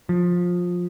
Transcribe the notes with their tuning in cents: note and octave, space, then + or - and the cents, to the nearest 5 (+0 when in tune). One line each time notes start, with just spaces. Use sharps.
F3 +20